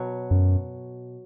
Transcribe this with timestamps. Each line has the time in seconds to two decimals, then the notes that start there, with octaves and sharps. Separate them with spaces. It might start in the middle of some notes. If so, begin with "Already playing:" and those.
Already playing: B2 F#3
0.31 F#2